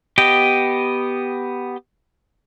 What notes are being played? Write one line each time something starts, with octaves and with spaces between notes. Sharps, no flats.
B3 G4 D#5 G5